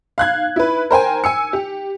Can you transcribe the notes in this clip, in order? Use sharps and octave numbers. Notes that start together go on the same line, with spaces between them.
F5 F#6 G#6
E4 B4
A#4 C5 G5 G#5
G#5 E6 C#7
G4